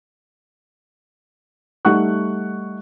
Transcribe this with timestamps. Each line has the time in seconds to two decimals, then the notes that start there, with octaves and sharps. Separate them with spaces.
1.85 G3 A3 D#4 F#5 C#6 F#6